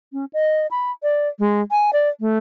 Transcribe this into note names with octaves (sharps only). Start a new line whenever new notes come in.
C#4
D#5
B5
D5
G#3
G#5
D5
A3